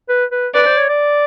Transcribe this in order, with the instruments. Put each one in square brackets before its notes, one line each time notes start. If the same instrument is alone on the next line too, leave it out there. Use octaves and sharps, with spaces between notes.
[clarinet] B4
B4
[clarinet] B4 [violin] D5
[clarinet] C5
C#5
D5